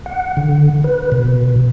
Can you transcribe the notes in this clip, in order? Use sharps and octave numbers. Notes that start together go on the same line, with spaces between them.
F#5
D3
B4
B2